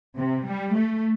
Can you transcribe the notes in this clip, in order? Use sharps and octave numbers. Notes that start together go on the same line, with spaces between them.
C3
G3
A3